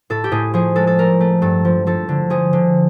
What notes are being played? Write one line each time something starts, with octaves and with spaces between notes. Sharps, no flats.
A2 A4
G4
A2 G#4
F3 G#4
G#3 A4
A4
A3 A#4
A3
G2 A4
F3
F3 A4
D3
F3 G#4
D3